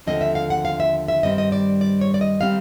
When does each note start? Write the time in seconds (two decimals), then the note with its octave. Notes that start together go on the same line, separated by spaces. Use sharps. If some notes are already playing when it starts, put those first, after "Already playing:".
0.06 D#2 D3 F3 A3 C4 D#5
0.21 E5
0.35 F5
0.50 F#5
0.65 F5
0.80 E5
1.08 E5
1.23 G2 D#3 G3 C4 D#5
1.38 D#5
1.52 D5
1.81 D5
2.01 C#5
2.14 D5
2.21 D#5
2.41 D#3 G3 C4 F5